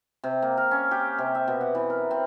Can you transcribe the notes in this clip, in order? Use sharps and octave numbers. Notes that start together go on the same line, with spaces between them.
C3
A#3
A#4
C#4
G4
C3
E5
B2
F#5
E3
A#4
C4